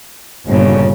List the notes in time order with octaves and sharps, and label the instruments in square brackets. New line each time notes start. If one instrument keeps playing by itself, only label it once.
[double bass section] G1 [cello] A#2 C#3